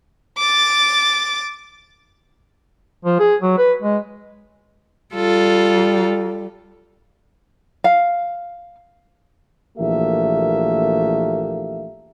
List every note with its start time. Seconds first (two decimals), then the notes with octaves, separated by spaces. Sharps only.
0.38 D6 A6
3.05 F3
3.19 G#4
3.42 F#3
3.58 B4
3.82 G#3
5.15 G3 F4 A4
7.84 F5
9.78 A#1 E3 A3 A#3 G4 E5